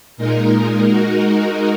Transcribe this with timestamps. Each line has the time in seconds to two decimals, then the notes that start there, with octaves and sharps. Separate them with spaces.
0.17 A#2 G#3 D#4 A#4
0.86 G#3 D#4 F#4 A#4